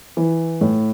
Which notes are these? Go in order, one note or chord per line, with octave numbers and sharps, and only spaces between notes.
E3
A2